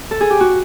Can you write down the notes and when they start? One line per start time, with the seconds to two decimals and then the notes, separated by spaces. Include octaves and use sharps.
0.11 A4
0.21 G#4
0.30 G4
0.40 F#4